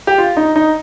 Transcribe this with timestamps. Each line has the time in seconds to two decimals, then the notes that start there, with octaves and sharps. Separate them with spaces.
0.07 G4
0.18 F4
0.37 D#4
0.56 D#4